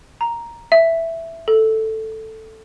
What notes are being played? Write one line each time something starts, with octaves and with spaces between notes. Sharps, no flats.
A#5
E5
A4